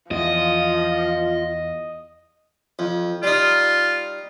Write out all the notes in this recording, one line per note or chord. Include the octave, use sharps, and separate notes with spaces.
E2 F3 F4 D#5
F2
G3 D#4 F4